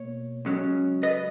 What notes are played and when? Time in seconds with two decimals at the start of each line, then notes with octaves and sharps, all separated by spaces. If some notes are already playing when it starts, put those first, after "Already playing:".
Already playing: B2 A#3 C#5
0.45 C#2 C#3 F#3 C#4
1.03 B4 D#5